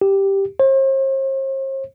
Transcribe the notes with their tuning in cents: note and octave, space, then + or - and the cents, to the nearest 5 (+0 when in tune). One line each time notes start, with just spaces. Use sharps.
G4 +0
C5 +45